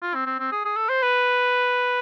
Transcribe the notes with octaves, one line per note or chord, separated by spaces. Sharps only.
F4
C4
C4
C4
G#4
G#4
A4
C5
B4